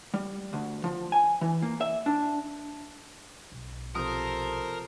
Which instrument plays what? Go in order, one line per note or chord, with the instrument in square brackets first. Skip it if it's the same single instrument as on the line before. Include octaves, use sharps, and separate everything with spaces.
[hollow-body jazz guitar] G3
D2
F3
G#5
E3
A#3
E5
D4
[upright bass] B1
[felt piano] C3 F3 D#6 [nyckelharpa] A4 C5 [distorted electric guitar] A#4